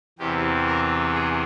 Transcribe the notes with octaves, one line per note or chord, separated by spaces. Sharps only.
E2 C3 E3 G4
A#4
G#4